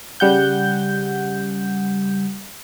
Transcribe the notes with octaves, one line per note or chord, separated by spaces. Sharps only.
C#3 G3 F#5 G6